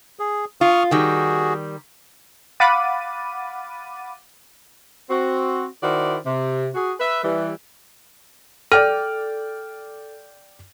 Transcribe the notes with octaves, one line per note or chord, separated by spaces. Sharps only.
G#4
F4 C#6 D#6 F6
D#3 G3 F#4 G#4
F5 F#5 B5 D6 A6 D#7
C4 F#4
D#3 E4 F#4 C5 D5
C3
F#4 G#4
B4 E5
E3 G3
A4 D5 G5 F6